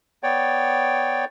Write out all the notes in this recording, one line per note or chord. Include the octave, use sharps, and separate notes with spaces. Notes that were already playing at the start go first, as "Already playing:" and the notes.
B3 C#5 D5 G5